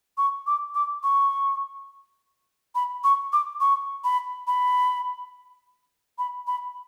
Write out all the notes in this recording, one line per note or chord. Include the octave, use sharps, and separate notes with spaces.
C#6
D6
D6
C#6
B5
C#6
D6
C#6
B5
B5
B5
B5